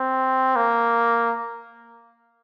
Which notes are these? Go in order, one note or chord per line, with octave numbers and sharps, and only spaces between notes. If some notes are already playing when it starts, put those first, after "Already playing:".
Already playing: C4
A#3